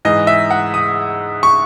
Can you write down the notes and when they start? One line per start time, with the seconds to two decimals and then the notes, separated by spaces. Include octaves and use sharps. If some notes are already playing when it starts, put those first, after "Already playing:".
0.05 G#2 E3 G#3 D#5
0.27 E5
0.51 F#5
0.74 D#6
1.43 C#6